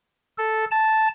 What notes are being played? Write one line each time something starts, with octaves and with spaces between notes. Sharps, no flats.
A4
A5